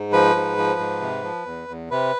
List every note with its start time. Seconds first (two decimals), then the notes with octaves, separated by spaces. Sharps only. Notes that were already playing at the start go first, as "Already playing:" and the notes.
Already playing: G#2
0.12 F3 B4
0.35 G#2
0.58 F3
0.80 G#2
1.01 C3
1.23 F3
1.46 E2
1.68 E2
1.91 C3 B4